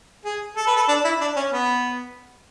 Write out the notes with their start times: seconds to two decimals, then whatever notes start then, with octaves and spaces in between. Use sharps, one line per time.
0.25 G#4
0.57 A4
0.67 B4
0.76 A4
0.88 D4
1.04 E4
1.21 D4
1.36 C#4
1.52 B3